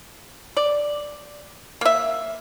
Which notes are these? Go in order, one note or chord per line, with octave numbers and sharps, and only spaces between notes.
D5
A#3 E5